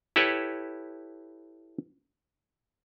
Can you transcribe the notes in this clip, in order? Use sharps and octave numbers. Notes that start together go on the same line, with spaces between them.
E4 G4 A4 B4 C#5